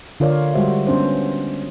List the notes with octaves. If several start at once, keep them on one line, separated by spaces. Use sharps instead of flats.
D3 F4 A#4 C#5 D5 F5
G3 G#3 F#4 C5 E5
B3 C#4 D4 C5